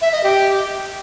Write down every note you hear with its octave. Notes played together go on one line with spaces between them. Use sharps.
E5
D#5
G4